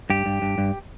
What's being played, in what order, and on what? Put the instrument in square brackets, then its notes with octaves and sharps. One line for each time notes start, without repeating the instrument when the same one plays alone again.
[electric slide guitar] G2 G4
G2
G2
G2